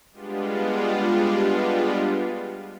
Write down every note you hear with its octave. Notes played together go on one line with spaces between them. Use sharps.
G3 G#3 B3 D4 F4